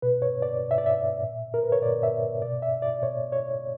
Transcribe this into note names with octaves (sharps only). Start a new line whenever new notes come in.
B2 B4
C#5
D5
B2
E5
D5
E5
A#2
A#4
B4
C#5
A#2 D5
E5
B2 D5
E5
D5
B2 C#5
C#5